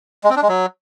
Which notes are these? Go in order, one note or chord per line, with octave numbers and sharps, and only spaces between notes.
G#3
C4
D4
G#3
F#3